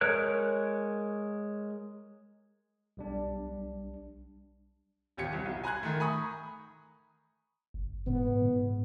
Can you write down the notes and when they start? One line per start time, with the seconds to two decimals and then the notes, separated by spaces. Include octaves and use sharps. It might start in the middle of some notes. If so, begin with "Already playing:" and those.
0.01 G#3 A#4 C#5 F#6
2.97 B1 G3 D4
5.17 A#1 D#2 G4 G#6 C#7
5.33 C2
5.45 B1
5.64 G#5 A#5 C6 F#6 G#6
5.83 D#3 A3
6.00 G#5 A#5 B5 C#6 D#6
7.74 F#1
8.07 G#2 B3
8.42 G#2